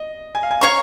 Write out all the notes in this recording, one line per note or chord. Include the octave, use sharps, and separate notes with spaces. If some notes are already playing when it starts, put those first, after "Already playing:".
Already playing: D#5
G#5
F5
G#5
C#5 F5 A#5 C#6